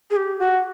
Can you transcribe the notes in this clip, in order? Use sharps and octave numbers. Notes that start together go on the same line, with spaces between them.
G#4
G4
F#4